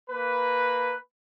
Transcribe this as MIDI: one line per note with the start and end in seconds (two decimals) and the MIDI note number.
0.10 0.94 58
0.10 0.94 71